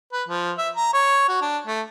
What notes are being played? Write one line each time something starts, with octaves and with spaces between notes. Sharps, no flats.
B4
F3
E5
A#5
C#5
F#4
D4
A3